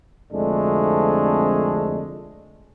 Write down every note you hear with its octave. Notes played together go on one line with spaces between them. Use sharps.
C2 F2 D3 G#3 A3 D4